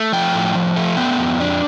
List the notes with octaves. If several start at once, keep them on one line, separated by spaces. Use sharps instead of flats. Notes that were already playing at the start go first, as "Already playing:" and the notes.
Already playing: A3
F3 G5
A2
F3
A3
B3 G5
F2
D4